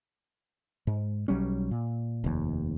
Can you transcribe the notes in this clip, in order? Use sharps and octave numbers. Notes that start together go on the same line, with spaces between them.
G#2
B1 F#3 G3 C#4
A#2
F1 D#2